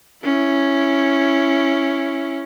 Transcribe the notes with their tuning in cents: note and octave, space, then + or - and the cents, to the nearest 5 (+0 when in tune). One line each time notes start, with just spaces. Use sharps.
C#4 +0 E4 +10